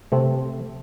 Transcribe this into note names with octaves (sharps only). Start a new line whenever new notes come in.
C3 A3 C4